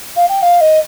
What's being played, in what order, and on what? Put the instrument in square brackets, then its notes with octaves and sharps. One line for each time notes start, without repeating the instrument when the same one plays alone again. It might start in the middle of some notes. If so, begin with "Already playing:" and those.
[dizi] F5
G5
F5
D#5